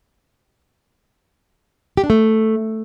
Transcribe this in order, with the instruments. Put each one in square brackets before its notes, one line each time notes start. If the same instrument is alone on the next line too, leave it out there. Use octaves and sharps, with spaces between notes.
[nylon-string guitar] G4
D4
A3